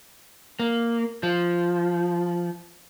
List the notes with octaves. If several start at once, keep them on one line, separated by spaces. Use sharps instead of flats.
A#3
F3